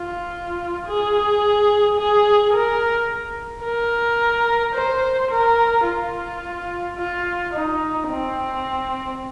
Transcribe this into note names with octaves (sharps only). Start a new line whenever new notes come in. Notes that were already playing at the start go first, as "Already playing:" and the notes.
Already playing: F4
G#4
G#4
A#4
A#4
C5
A#4
F4
F4
D#4
C4